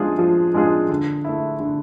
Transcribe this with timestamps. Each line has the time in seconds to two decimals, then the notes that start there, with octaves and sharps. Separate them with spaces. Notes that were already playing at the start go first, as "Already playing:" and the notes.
Already playing: F3 G#3 D4 F4 G#4
0.19 F3
0.54 G#3 D4 F4 G#4
0.89 D3
1.25 A3 E4
1.60 D3